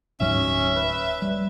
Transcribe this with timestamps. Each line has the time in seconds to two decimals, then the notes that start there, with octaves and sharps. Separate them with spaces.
0.20 D1 G#2 F#3 C#4 E5
0.76 B4
1.22 G3